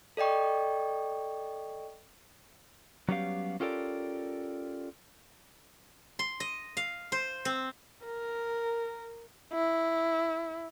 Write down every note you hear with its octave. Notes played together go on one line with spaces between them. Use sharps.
A4 D5 D#5 G5 C#6
F#3 G3 B3 C#4 G4 F5
C#4 F4 G4 A4 A#4 D5
C6
D#5
F5
C5
C4
A#4
E4